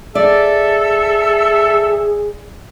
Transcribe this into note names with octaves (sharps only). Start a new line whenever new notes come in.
G#4 A4 D5 E5